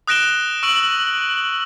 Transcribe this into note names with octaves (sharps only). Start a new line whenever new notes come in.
D#6 F#6 A#6 D7 E7 G7
C#6 E6 D7 F#7